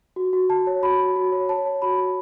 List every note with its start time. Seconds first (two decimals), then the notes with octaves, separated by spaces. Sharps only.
0.16 F#4
0.33 F#4
0.50 F#4 A5
0.67 C#5
0.83 F#4 B5
1.00 F#4
1.16 F#4
1.32 C#5
1.49 C#5 A5
1.66 C#5
1.82 F#4 B5
1.98 F#4